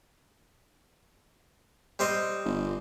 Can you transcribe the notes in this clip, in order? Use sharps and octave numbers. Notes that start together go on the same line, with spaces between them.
G3 C4 D#5
G1